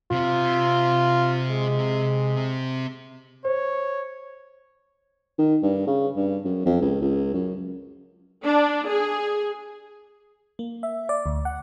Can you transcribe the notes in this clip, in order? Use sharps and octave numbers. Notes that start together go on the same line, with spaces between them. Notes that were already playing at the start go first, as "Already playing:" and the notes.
C3 C4 F4
G#3
C5 C#5
D#3
G2
C#3
G2
F#2
F2
C#2
C#2
F#2
D4
G#4
A#3
E5
D5
D2
F#5